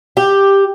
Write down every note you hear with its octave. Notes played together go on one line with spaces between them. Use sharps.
G4